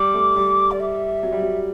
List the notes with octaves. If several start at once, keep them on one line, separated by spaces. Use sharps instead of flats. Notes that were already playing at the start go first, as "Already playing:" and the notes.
Already playing: G3 D6
A3
G3
D5
E5
F#3
G3
F#3